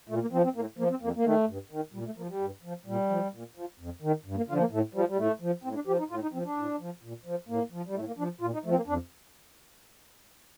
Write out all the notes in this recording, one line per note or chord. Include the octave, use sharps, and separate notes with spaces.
A#2 A3
A#3
F3 C4
C4
A2 A#3
F3 A#3
C4
F2 A#3
A#3
D#3 A3
G2
D#3
A#2 G3
A3
F3 A#3
G3
G2
F3
A#2 G3
F3
A#2
F3
F2
D#3
G2
A#3
D3 F3 F4
A#3
A2 A3
F3 G3
G3
A2 A3
F3
A2 C4
D4
F3 G4
D#4
A2 F4
D#4
F3 C4
D4
A2
F3
A#2
F3
A2 A#3
F3
G3
A2 A3
A#3
F3 D4
A#2 F4
D#4
F3 A3
C4
A#3
F2 D4